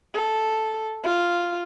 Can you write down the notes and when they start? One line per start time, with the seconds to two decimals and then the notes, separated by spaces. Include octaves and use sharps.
0.14 A4
1.04 F4